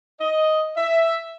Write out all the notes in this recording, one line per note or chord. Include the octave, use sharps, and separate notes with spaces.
D#5
E5